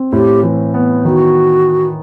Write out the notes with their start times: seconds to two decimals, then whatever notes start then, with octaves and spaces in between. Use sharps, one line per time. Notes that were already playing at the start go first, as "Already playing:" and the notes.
Already playing: C4
0.12 A2 G4
0.43 E3
0.74 B3
1.04 D#3 F#4